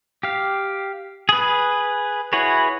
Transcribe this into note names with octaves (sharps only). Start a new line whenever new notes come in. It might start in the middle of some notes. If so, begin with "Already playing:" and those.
G4 F5
G#4 B4
E4 F#4 G#4 B4 C#5